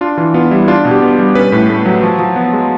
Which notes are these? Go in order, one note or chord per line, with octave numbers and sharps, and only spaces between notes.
D4 F4
E3 F4
B3 F4
G3 E4
D4 F4
B2
G4
B3
G3
C#4 B4
A2
A3
F#3
F3
F3
B3
G#3